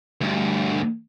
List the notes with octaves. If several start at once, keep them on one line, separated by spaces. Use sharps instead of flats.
D2 G2